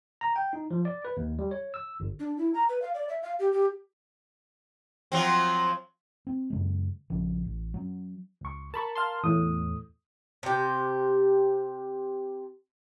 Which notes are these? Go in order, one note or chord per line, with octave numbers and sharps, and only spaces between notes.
A#5
G5
D#4
F3
D5
B4
D#2
G3
C#5
E6
G1
D4
E4
A#5
B4
F5
D5
E5
F5
G4
G4
F3 F#3 C4
C4
F#2 C#3 G#3
A#1 C#3 F3 C#4
A1
F#3 C#4
C#2 C#6
A#4 A5 B5 C#6
F5 A5 C6
E2 A2 D#6
C3 G4